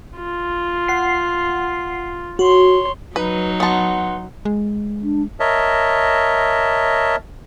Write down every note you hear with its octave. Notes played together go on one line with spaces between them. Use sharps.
F4
F#5 C7
F#4 C#5 C6
F#3 D#4 B4
B3 F#5 A5 C6
G#3
D4
A#4 C#5 D#5 E5 A5